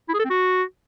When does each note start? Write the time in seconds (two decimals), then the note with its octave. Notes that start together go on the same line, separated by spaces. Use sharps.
0.08 E4
0.14 G#4
0.19 A4
0.24 C4
0.30 F#4